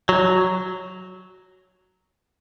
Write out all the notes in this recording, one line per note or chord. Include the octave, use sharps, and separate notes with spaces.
F#3